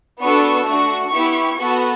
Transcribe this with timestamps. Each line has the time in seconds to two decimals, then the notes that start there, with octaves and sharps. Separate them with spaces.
0.20 B3 D4 F#4 A4 C#6
0.67 A3 D4 F#4 C#6
1.13 B3 E4 G4
1.59 B3 F#4 A4